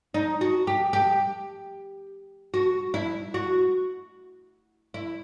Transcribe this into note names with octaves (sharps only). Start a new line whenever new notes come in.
D#4
F#4
G4
G4
F#4
E4
F#4
E4